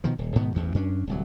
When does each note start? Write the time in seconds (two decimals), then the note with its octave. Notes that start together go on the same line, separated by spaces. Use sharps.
0.04 B2 D#3 F3
0.18 D#1
0.35 G#2 B2 D#3 B3
0.54 A1 E2 G2
0.75 F#2 C#4 D4
1.07 D1 C2 F#3